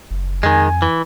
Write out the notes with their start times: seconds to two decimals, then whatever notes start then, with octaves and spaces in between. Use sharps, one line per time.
0.11 F#1
0.43 F2 D#3 G#3 G#5
0.82 E3